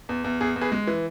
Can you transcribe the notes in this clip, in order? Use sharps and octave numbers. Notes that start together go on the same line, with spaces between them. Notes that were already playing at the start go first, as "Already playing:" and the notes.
E2
E2
E2 G#4
E2
G#4 B4
G#3
E3